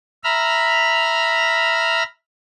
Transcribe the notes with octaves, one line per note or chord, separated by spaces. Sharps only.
E5 A#5 B5 F6